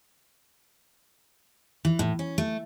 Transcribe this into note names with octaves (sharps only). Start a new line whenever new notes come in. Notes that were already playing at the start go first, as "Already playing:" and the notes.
E3
A2
C#4
A3